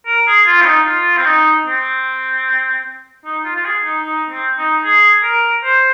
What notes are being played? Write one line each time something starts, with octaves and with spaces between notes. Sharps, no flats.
A#4
G#4
F4
C4
D#4
F4
C4
D#4
C4
D#4
F4
F4
G#4
D#4
D#4
C4
D#4
G#4
A#4
C5